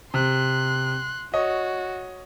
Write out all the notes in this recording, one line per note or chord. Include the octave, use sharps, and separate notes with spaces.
C3 C6 F#6
F#4 C#5 D#5